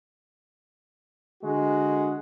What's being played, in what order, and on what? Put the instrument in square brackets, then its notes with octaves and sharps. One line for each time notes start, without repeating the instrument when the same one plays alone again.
[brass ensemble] D3 G#3 F#4